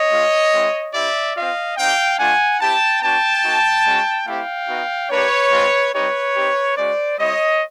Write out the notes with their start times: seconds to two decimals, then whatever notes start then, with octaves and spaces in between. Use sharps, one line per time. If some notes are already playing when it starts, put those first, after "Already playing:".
Already playing: C#5 D#5
0.11 G#3 C#4 F4
0.53 G#3 C4 E4
0.94 C4 E4 G4 D5 E5
1.35 C4 F4 D#5 F5
1.77 C4 D#4 G4 F5 G5
2.19 A3 D4 F4 F#5 G#5
2.60 C4 E4 G4 G5 A5
3.02 B3 D4 F#4 G5 A5
3.44 A#3 D#4 F#4
3.86 G#3 C#4 F#4
4.26 A3 C4 E4 G4 F5 G5
4.69 B3 D#4 F#4
5.10 A#3 D4 G4 B4 C#5
5.51 G#3 C4 F4
5.93 G3 C4 D#4 G4 B4 C#5
6.35 C4 D#4 G4
6.77 G#3 C#4 F#4 C5 D5
7.19 G3 C4 E4 C#5 D#5